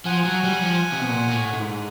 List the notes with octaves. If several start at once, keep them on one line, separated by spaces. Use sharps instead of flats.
F3 F#5 G#5
F#3
G3
F3
C3
B2
A#2
A#2
A2
A2
G#2